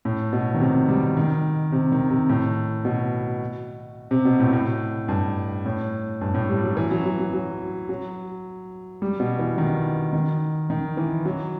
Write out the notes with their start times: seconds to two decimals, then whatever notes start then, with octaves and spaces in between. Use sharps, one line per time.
0.05 A2
0.33 B2
0.54 D#3
0.61 C3
0.88 G3
1.17 D#3
1.72 C3
1.92 D#3
2.10 C3
2.29 A2
2.85 B2
4.11 C3
4.25 B2
4.39 A2
4.53 A2
5.08 G2
5.66 A2
6.21 G2
6.34 A2
6.49 G3
6.64 F#3
6.77 E3
6.91 F#3
7.05 F#3
7.19 F#3
7.33 F#3
7.89 F#3
9.02 G3
9.20 B2
9.39 E3
9.58 D#3
10.13 D#3
10.70 D#3
10.97 E3
11.25 F#3